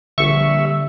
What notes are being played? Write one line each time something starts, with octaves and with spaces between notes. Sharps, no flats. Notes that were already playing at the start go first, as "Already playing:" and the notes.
A#1 D3 G3 E5 C#6